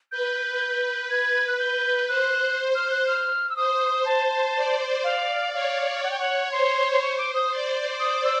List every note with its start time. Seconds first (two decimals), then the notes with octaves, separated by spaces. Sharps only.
0.12 B4 G6
1.10 G#6
1.48 F#6
1.59 G6
2.08 C5 F#6
2.75 F6
2.91 F#6
3.07 F6
3.50 E6
3.56 C5 D#6
4.05 A5
4.56 D5
5.04 F5
5.53 C#5 F5
6.03 F#5
6.11 G5
6.19 F#5
6.52 C5 C6
6.93 C6
7.02 C#6
7.18 D6
7.34 D#6
7.51 D5
8.00 D#6
8.24 E6